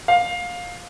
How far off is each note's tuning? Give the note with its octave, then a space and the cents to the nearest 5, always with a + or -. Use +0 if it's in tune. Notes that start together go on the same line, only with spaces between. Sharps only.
F5 +20